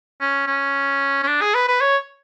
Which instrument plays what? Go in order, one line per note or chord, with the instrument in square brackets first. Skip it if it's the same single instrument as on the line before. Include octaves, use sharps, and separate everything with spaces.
[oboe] C#4
C#4
C#4
D4
G#4
B4
B4
C#5